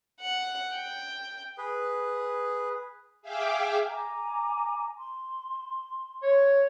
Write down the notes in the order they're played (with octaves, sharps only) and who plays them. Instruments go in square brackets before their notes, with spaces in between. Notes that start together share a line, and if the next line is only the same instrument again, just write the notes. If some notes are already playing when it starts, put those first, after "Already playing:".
[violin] F#5
G5
[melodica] G#4 B4
[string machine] G#4 E5 F5 G5 D6
[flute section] G#5 A#5 D6
C6
[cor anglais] C#5